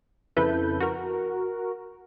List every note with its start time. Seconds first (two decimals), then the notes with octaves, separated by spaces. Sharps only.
0.36 F2 C#3 E4 A4 B4 G6
0.80 F#4 A#4